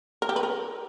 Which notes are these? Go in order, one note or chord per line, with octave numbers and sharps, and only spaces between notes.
A#4
G4
B4
A#4